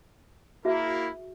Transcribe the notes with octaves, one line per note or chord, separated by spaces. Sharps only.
A#3 E4 F#4 G#4 E5